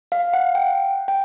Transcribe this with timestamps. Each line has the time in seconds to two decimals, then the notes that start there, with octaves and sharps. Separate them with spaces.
0.12 F5
0.33 F#5
0.55 G5
1.08 G5